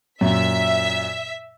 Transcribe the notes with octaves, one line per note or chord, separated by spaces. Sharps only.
F#2 A#2 E5 B6